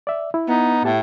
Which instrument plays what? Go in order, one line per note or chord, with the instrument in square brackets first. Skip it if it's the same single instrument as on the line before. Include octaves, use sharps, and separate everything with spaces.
[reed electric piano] D5 E5
E4
[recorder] B3 [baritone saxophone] D#4
[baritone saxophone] A2 [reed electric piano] G4 A5